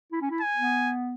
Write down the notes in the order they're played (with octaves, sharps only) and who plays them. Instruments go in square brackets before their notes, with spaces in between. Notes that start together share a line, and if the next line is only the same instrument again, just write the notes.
[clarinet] E4
C#4
E4
[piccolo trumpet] G#5
[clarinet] B3